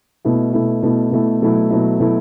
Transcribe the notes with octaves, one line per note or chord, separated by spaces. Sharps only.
B2 A3 E4
B2 A3 E4
B2 A3 E4
B2 A3 E4
B2 F#3 A3 E4
B2 F#3 A3 E4
B2 F#3 A3 E4